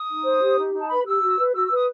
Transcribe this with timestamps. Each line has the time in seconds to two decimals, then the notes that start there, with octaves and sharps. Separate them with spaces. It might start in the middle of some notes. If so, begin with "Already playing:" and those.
Already playing: D#6
0.09 D#4
0.24 C5
0.41 G4
0.57 D#4
0.74 D#4
0.79 A5
0.89 B4 B5
1.06 G4 E6
1.22 F#4
1.38 B4
1.54 F#4 E6
1.65 E6
1.71 B4 D#6